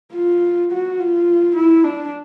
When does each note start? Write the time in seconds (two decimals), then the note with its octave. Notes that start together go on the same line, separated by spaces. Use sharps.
0.13 F4
0.72 F#4
0.99 F4
1.56 E4
1.84 D4